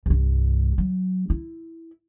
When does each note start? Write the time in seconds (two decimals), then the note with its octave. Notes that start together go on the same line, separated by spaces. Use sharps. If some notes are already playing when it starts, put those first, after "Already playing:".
0.06 C2 G2
0.78 F#3
1.30 E4